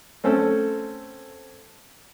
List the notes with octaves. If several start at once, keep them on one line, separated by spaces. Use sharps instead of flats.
A3 C4 C#4 A4